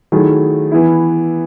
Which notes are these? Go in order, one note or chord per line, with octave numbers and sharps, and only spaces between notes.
D#3 F#3 A3 E4 G#4
E3 B3 E4